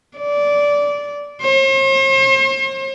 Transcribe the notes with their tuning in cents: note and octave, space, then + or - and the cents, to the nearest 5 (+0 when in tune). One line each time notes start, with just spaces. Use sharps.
D5 -15
C5 +45